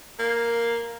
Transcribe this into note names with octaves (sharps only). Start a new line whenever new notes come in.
A#3